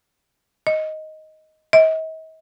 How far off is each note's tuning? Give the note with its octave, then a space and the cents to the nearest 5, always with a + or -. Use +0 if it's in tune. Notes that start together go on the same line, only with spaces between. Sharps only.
D#5 +5
D#5 +45